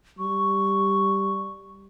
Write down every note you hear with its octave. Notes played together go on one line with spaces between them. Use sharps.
G3 C#6